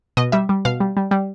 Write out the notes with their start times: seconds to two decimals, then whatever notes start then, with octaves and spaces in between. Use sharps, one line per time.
0.17 B2 D#5
0.32 G3 E5
0.49 G3
0.65 B2 F5
0.80 G3
0.97 G3
1.11 G3